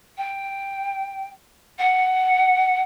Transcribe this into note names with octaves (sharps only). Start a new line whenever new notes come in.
G5
F#5